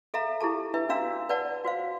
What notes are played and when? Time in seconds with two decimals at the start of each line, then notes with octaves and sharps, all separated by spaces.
0.14 A4 E5 F5 A#5
0.41 E4 G4 A4 A5
0.74 D4 E4 B4 E5
0.89 C#4 D4 F#4 F5 A#5 E6
1.29 B4 C#5 D5 F#5 A5
1.65 F#4 C5 F5